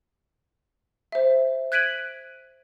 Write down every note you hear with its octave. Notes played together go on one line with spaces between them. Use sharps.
C5 E5
F#6 G#6 B6 D7 D#7 F#7